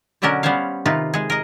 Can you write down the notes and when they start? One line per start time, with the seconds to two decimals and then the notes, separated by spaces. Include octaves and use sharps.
0.22 B2 D3 F#3 C#4 D4 A#4
0.43 G3 B3 C#4 C5 C#5 F5
0.86 C3 D#3 D#4 F4 B4
1.14 G#3 G#4
1.30 A#4 D#5